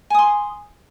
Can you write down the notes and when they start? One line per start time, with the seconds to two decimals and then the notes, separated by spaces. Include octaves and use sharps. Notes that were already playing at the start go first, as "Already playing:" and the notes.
0.10 G#5
0.15 D#6
0.19 C6